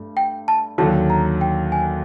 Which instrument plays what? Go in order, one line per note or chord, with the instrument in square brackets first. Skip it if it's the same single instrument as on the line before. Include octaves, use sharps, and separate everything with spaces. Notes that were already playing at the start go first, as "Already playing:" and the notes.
Already playing: [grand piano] G2 A3
[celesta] G5
A5
[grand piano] D#2 D3 F#3 [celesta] A5
[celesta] A#5
G5
G#5